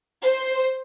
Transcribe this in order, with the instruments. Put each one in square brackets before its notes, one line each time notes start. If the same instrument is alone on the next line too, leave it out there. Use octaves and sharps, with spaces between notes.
[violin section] C5